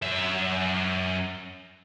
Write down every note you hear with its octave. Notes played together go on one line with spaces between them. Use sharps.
F#2 E5